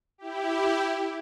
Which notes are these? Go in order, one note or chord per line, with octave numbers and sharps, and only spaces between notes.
E4 G4